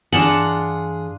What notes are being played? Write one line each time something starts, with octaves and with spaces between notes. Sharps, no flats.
G2 E3 D4 F4 G#4 F#5 A5 A#5